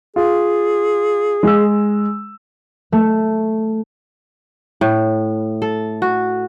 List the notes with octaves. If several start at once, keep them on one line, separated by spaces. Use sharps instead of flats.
F4 G#4
G#3 E6
A3
A2
A4
F#4